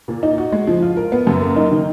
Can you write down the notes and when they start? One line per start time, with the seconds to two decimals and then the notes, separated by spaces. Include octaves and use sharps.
0.08 A#2
0.23 D#4
0.38 F#4
0.52 G#3
0.67 F3
0.82 F4
0.97 A#4
1.12 B3
1.27 F#2
1.41 A#3
1.56 D#4
1.72 D#3